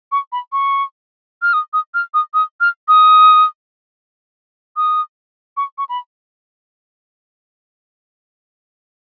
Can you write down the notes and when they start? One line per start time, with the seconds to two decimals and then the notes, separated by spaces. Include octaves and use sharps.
0.12 C#6
0.32 B5
0.52 C#6
1.42 F6
1.53 D#6
1.73 D#6
1.94 F6
2.14 D#6
2.34 D#6
2.61 F6
2.88 D#6
4.77 D#6
5.57 C#6
5.78 C#6
5.89 B5